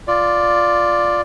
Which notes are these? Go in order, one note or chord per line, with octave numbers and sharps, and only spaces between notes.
F4 D5